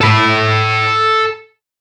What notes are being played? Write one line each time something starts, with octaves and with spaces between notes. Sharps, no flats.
A4 B5